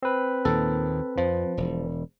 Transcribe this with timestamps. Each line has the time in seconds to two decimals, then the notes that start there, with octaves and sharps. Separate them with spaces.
0.03 C4 B4
0.45 D#2 A#2 D#3 A4
1.18 F2 F3
1.57 E1